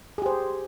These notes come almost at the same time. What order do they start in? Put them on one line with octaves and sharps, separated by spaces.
G#4 G4 C5